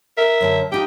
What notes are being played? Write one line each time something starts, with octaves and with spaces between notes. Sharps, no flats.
A#4 E5
F#2 D3 A5
D4 D#4 F4 G4 G5